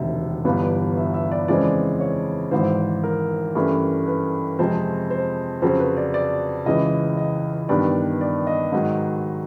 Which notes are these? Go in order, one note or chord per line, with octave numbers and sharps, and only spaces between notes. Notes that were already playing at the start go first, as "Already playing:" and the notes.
Already playing: E1 D2 C3 D#3 E5
G1 G2 E3 G3 B3 F5
E5
E5
D5
F2 C#3 E3 G#3 C4 D5
C#5
G#1 G#2 E3 C5
A#4
G2 E3 A3 C#4
B4
F2 C3 F3 G#3 C4 C5
C5
F2 C#3 F#3 C5
B4
D5
D5
C#2 C#3 E3 D#5
D#5
G2 D#3 G3 B3 D4 D5
D5
D#5
G#2 D#3 F#3